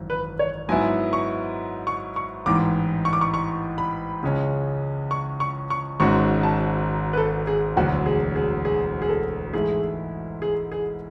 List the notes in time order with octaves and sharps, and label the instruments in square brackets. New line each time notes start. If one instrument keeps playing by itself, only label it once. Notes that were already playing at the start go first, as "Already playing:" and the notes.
Already playing: [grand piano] G#1 F#2 E3
[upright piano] B4
C#5
[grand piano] G#2 F#3 B3 E4 [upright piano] G#5
[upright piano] C#6
C#6
C#6
[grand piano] A1 G#2 E3 [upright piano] D6
[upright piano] C#6
D6
C#6
C#6
B5
[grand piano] C#2 C#3 G#3 C#4
[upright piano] C#6
C#6
C#6
[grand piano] G#1 G#2 G#3 C#4 F#4 [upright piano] C#6
[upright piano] A5
B4
A4
G#4
[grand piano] E1 D2 D3 F#3 [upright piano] F#4
[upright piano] G#4
G#4
G#4
G#4
A4
[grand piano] G#2 E3 A3 E4 [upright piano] G#4
[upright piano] G#4
G#4